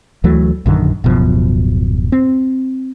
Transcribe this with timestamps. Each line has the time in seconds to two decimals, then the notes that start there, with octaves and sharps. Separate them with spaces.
0.24 D2 E3 F#3 A3
0.66 A#1 F#2 D3 D#3
1.04 D1 F#2 B2 F3
2.12 C4